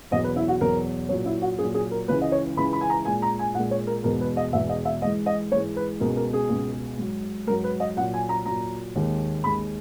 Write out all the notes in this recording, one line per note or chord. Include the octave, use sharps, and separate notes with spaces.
E2 B2 F#3 D#5
B4
E4
F#4
E2 B2 F#3 A#4
A#2 F#3 C#5
E4
F#4
A#2 F#3 G#4
G#4
A#4
C#2 C#3 E3 G#3 B4
D#5
C#5
C#2 C#3 E3 G#3 B5
B5
G#5
A#5
A#2 G#3 G#5
A#5
G#5
A#2 G#3 F#5
C#5
A#4
E2 B2 G#3 A#4
B4
D#5
E2 B2 G#3 E5
D#5
E5
G#2 E3 G#3 D#5
D#5
G#2 E3 G#3 C#5
B4
C#2 B2 G#3 A#4
A#4
G#4
C#2 B2 G#3
G#2 F#3
G#2 F#3 A#4
B4
D#5
A#2 F#3 F#5
G#5
A#5
A#2 F#3 A#5
D#2 D#3 G#3
D#2 D#3 G#3 B5